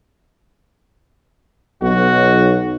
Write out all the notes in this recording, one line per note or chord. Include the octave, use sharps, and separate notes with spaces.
B1 D#4 F#4